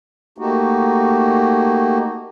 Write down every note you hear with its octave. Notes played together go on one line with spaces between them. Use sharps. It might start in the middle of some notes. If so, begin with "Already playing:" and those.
A3 A#3 D#4 F#4 G4